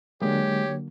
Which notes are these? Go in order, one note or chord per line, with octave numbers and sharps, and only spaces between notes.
D3 F#3 G#3 A#3 G4 C#5